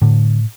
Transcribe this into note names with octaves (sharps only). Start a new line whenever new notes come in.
A2 D3